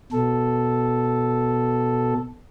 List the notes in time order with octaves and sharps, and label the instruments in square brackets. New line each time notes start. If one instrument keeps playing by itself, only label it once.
[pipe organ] B2 A4